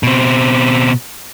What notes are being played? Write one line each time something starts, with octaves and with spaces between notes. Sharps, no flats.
B2 C4